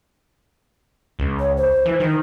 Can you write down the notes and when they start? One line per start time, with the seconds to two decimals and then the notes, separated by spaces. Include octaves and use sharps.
1.19 C#2
1.39 C#5
1.57 C5
1.85 E3
2.00 D#3 D#4